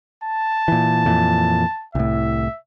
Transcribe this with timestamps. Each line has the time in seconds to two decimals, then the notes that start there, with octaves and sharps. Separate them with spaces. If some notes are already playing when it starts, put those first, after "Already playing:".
0.24 A5
0.68 A#2 E3
1.05 F2 A#2 E3
1.95 C2 A2 E5